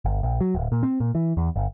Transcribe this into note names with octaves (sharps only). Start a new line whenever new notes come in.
G1
A#1
F#3
D1
A#2
C4
A#2
E3
E2
G1